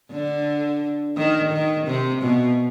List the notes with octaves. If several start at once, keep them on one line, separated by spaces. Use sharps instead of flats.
D3
D#3
D#3
C3
B2